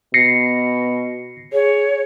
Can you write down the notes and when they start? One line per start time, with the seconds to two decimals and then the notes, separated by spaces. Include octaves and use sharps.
0.14 B2 A#6 C7 C#7
1.53 G#4 C#5